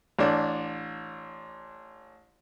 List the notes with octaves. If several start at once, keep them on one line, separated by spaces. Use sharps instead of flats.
A1 D4